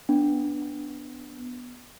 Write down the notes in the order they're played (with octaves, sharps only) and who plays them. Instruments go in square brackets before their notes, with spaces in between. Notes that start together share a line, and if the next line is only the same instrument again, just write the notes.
[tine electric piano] B3 [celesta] D4